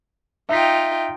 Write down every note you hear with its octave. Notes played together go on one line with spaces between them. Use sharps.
D#4 F4 E5 G5 B6